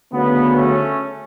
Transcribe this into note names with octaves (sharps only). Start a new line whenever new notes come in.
D2 C#3 F#3 B3
A3 C#4